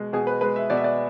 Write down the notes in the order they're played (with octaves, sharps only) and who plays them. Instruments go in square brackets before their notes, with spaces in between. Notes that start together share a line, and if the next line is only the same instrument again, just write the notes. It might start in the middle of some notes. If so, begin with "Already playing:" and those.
Already playing: [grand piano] B2 G#3
B2 G#4
B4
G#3 B4
E5
B2 D5
E5
D5